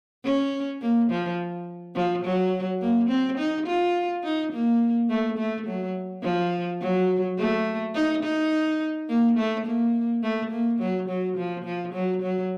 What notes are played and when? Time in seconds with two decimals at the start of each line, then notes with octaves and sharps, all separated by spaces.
0.24 C#4
0.82 A#3
1.11 F3
1.95 F3
2.24 F#3
2.81 A#3
3.09 C4
3.38 D#4
3.67 F4
4.24 D#4
4.53 A#3
5.09 A3
5.38 A3
5.67 F#3
6.23 F3
6.81 F#3
7.38 A3
7.95 D#4
8.23 D#4
9.09 A#3
9.37 A3
9.66 A#3
10.23 A3
10.51 A#3
10.79 F#3
11.09 F#3
11.37 F3
11.65 F3
11.94 F#3
12.22 F#3